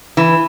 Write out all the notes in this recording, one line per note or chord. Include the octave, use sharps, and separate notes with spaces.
E3